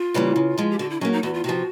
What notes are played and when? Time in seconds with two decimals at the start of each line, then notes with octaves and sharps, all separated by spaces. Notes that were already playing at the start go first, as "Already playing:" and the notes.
Already playing: F4
0.14 C#3 E3 G3 A#3
0.36 C#3
0.58 F3 G#3
0.71 G4
0.79 D3 F#4
0.90 E4
1.01 F#3 A#3 C#4
1.12 D#4
1.23 E2 F#4
1.34 F4
1.44 C3 F3 F#4